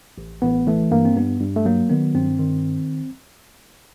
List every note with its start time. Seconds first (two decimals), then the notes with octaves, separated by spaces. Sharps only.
0.18 A1
0.42 A1 B3
0.67 E3 A3
0.91 G2 A#3
1.05 C4
1.16 G2 B3
1.40 G2
1.56 A3
1.65 F#3 A#3
1.90 D#3 B3
2.15 G2 C4
2.39 D#3